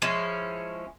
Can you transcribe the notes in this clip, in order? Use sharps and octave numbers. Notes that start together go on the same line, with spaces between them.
F3 G#3 C#4 E4